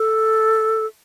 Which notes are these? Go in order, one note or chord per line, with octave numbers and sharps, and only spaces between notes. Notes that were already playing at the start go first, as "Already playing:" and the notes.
Already playing: A4